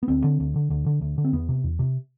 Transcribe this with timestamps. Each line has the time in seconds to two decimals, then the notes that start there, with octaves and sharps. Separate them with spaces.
0.03 B3
0.08 D2 C4
0.24 D3
0.40 D2
0.56 D3
0.70 D2
0.86 D3
1.01 D2
1.18 D3
1.25 C4
1.33 E2 B3
1.49 C3
1.64 E2
1.79 C3